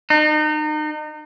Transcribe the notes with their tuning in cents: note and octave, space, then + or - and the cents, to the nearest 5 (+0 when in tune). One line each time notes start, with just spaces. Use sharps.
D#4 -35